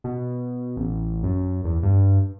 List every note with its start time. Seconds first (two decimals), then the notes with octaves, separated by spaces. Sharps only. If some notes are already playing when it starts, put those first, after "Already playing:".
0.04 B2
0.77 A1
1.23 F#2
1.64 E2
1.83 G2